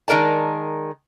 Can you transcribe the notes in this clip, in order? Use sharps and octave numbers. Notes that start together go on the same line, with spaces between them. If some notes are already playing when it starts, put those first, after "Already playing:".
D#3 G#3 A#4 D5 A5